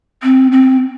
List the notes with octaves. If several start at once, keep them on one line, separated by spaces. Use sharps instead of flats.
C4
C4